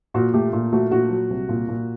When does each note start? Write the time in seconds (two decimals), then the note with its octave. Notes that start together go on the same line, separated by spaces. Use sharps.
0.14 A#2 F#4
0.34 A3 G4
0.53 A#2
0.72 A3 F#4
0.91 A#2 F#4
1.10 F#3
1.30 C2
1.49 A#2
1.68 A#2